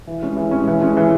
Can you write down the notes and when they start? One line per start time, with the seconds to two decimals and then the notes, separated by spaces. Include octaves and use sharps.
0.07 E3
0.22 G#3 C#4
0.37 E3
0.51 G#3 C#4
0.67 E3
0.81 G#3 C#4
0.97 E3